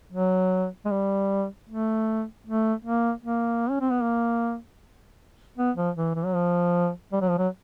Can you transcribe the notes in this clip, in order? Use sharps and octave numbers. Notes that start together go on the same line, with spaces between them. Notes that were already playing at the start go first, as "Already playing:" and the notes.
F#3
G#3
G3
A3
A3
A#3
A#3
C#4
C4
B3
A#3
B3
F3
E3
E3
F#3
F3
G3
F#3
F3
F#3